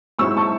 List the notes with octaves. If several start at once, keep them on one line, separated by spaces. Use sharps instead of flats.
G#2 F#3 C4 E4 C#6 E6
A5 C#6